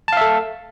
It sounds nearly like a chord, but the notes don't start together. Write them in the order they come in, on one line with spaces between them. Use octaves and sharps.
A5 F5 E5 A4